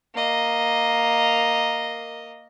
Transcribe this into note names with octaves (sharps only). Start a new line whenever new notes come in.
A#3 D#5